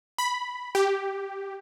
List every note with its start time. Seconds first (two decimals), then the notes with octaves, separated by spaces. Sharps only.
0.18 B5
0.75 G4